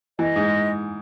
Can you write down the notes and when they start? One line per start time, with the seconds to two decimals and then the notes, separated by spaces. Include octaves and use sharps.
0.19 E3 D#5
0.36 G#2